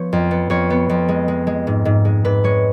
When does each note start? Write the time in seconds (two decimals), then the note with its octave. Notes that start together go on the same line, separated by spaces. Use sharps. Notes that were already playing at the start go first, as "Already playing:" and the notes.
Already playing: F3 B3 C#5
0.13 F2
0.31 B3
0.50 F2 C#5
0.70 B3
0.89 F2
1.09 G#3
1.28 G#3
1.47 G#3
1.67 G#2
1.85 G#2
2.05 G#3
2.25 G#2 B4
2.44 G#3 C#5